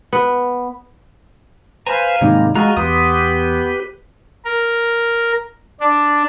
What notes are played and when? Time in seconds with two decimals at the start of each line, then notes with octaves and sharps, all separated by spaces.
0.13 B3
1.87 B4 C5 F5 G#5 A#5
2.21 G#2 C3 D#3 G3 G#3 A#3
2.55 G#3 F4 F#4 D#5 G#5 A#5
2.77 E2 B3 G4 B4 C6 D#6
4.45 A#4
5.80 D4